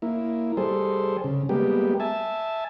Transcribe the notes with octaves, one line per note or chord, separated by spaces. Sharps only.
A#3 E4
G3 G#4 A4 C5
C#3
G3 G#3 A#3 B3 G4
E5 G#5 A5